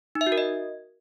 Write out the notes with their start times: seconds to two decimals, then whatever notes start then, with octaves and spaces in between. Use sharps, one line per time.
0.15 D#4
0.21 E5
0.27 F#4
0.32 A#4
0.38 D#5